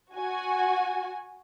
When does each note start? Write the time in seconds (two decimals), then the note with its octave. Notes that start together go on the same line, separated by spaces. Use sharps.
0.15 F#4 G#5